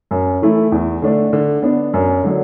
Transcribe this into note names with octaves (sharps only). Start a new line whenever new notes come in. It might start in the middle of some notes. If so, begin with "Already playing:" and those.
F#2
E3 A3 E4
E2
D3 A3 D4
D3
B3 D4
F#2
D3 F#3 D4